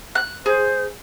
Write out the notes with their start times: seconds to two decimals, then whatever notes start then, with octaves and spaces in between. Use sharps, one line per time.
0.15 F#6
0.46 G#4 C5